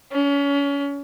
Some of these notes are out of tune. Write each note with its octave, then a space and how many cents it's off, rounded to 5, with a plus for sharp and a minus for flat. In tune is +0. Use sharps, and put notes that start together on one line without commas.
C#4 +30